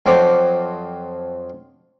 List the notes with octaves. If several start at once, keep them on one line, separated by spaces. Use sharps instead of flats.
F2 F#3 C4 D6